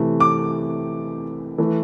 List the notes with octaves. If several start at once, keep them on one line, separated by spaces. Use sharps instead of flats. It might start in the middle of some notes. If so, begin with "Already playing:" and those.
Already playing: C3 E3 A3
D6
E3 A3